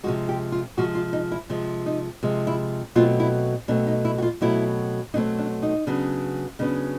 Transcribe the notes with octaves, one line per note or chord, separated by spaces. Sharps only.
C3 F3 G#3 F#4
G4
F4
C3 F3 G#3 F#4
F4
D#4
E4
C3 F3 G#3
D#4
C3 F3 G#3
E4
B2 F#3 A3 C4 F4
E4
B2 F#3 A3 C4 D4
D#4
E4
F#4
F4
B2 F#3 A3 C4 E4
B2 F#3 A3 C4 D#4
D4
D#4
C#3 F#3 B3 D4
C#3 F#3 B3 D4 D#4